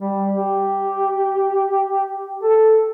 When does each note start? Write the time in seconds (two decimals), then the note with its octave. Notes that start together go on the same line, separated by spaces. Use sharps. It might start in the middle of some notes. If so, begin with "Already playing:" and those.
0.01 G3
0.37 G4
2.43 A4